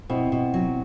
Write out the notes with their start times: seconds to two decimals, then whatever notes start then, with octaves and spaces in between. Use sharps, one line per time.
0.10 B2 C4 E4
0.32 B2
0.54 F#3